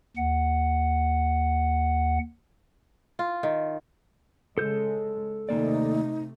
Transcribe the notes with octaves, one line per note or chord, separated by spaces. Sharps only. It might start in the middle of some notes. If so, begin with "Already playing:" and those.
D#2 F#5
F4
D#3
C#3 G#3 A4 G6
D#2 C3 A3 A#3 D#4 D5